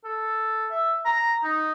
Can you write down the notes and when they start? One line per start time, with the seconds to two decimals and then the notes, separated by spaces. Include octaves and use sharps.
0.04 A4
0.71 E5
1.05 A#5
1.44 D#4